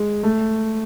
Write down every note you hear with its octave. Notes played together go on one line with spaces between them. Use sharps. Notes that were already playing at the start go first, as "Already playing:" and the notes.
Already playing: G#3
A3